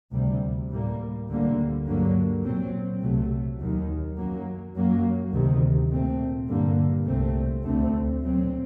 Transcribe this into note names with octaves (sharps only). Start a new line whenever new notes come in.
D2 C3 G3
A2 G3 A#3
D2 D3 G3 A#3
G2 D3 F#3 A#3
A#2 F#3 C4
C2 C3 F#3 A3
D#2 D#3 F#3
F#2 F#3 A#3
F#2 F#3 A#3
D2 C3 D#3
A#2 A3 C4
G2 D3 G3 A#3
C2 A#2 A3 C4
D2 D3 A3 C4
A#2 F#3 C4